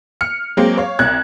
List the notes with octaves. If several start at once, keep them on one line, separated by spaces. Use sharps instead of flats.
F6 C#7
F#3 G#3 A#3 C4
C#5 F5
C2 F#6 G#6